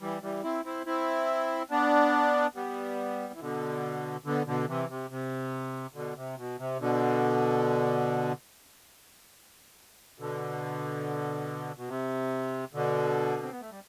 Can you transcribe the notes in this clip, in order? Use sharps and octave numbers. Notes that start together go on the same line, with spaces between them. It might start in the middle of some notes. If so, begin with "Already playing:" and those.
E3 G3
E3 G3
C4 E4
C4 E4
C4 E4
B3 D4
G3 B3
E3
B2 D3
B2 D3
B2 D3
C3 E3
C3
C3
B2 D3
C3
B2
C3
B2 D3
B2 D3
B2
C3
B2 D3
C4
B3
A3
G3